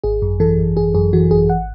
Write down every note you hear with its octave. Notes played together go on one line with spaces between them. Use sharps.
G#1 G#4
F#2
E3 A4
G#1
G#1 G#4
F#2 G#4
E3 F#4
G#1 G#4
F#5